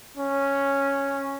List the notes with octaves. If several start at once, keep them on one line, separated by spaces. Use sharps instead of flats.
C#4